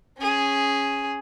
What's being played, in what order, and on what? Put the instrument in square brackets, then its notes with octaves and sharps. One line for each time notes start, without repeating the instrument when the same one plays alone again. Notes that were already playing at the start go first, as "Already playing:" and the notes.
[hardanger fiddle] C#4 G#4